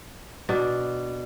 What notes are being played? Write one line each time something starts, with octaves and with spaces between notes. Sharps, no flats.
B2 D4